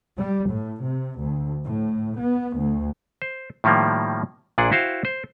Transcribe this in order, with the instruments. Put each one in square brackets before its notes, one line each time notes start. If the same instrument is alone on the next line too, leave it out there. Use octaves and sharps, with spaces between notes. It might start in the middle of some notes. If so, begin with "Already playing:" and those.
[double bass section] G3
A2
C3
D2
A2
B3
D2
[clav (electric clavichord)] C5
A2 D#3 F3 G3 A#3
A#1 A#2 D4 G#4 D5 F#5
E4 F#4 C5 F5 G5
C5